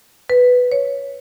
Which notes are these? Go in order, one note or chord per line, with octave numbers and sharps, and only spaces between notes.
B4
C#5